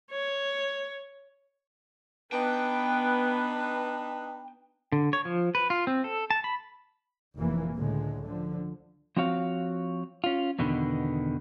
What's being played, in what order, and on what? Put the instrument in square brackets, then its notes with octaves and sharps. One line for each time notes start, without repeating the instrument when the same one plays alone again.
[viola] C#5
[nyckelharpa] B3 [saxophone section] D4 D#4 B4 [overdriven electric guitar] G5
[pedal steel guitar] D3
C#5
F3
B4
F4
C4
A4
A5
B5
[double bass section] F1 E3 A#3
C#2 A2 D3 G#3
D3 F3
[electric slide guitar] F3 C4 F#4 C#5 F5
C#4 F4
E2 B2 D3 D#3 B3